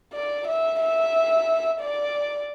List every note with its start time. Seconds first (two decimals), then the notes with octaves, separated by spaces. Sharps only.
0.13 D5
0.47 E5
0.80 E5
1.80 D5